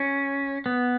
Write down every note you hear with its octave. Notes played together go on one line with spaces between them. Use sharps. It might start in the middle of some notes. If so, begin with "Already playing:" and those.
Already playing: C#4
B3